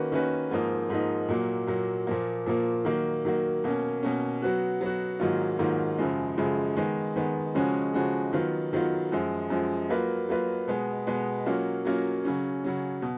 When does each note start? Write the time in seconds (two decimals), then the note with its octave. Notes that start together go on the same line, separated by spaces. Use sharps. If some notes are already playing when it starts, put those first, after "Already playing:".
Already playing: D#3 A#3 C#4 F#4 B4
0.12 D#3 A#3 C#4 F#4 B4
0.51 G#2 F3 A#3 D#4
0.90 G#2 F3 A#3 D#4
1.29 A#2 F#3 A#3
1.67 A#2 F#3 A#3
2.07 A#2 F3 A#3
2.46 A#2 F3 A#3
2.85 D#3 F#3 A#3
3.25 D#3 F#3 A#3
3.64 B2 A#3 C#4
4.03 B2 A#3 C#4
4.42 F#3 B3 F#4
4.81 F#3 B3 F#4
5.20 G#2 D#3 F#3 A#3 F4
5.59 G#2 D#3 F#3 A#3 F4
5.98 F#2 C#3 F3 G#3
6.38 F#2 C#3 F3 G#3
6.77 D#3 G#3 B3
7.16 D#3 G#3 B3
7.55 C#3 F3 G#3 C#4 F#4
7.94 C#3 F3 G#3 C#4 F#4
8.33 D#3 F#3 B3 F4
8.73 D#3 F#3 B3 F4
9.12 F#2 F3 G#3
9.50 F#2 F3 G#3
9.89 F#3 A#3 F4 B4
10.29 F#3 A#3 F4 B4
10.68 B2 G#3 B3
11.07 B2 G#3 B3
11.46 F#3 A#3 C#4 F4
11.85 F#3 A#3 C#4 F4
12.25 C#3 F#3 C#4
12.64 C#3 F#3 C#4
13.02 B2